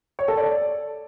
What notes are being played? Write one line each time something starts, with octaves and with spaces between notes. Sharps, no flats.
C#5
A4
D5